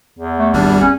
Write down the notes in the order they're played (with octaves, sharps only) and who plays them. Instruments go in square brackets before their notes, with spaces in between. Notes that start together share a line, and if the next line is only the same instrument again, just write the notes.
[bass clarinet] E2
[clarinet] A3
[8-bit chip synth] G#1 G3 [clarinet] D4
[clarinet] C#4